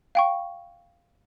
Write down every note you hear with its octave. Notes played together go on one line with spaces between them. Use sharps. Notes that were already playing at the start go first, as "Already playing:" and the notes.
F5 G5 C#6